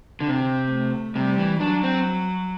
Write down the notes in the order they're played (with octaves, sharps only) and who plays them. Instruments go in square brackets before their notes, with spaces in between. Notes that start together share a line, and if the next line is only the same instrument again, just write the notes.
[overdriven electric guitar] D3
[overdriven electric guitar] C3 [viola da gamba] C4
[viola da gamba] A3
[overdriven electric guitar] C3 [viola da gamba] G3
[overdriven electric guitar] E3
[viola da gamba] F#3 [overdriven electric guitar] D4
[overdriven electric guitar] C4